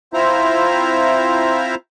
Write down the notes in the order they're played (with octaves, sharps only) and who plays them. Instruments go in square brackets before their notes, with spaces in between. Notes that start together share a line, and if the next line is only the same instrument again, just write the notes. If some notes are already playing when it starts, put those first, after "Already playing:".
[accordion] C4 E4 F4 C5 E5 A#5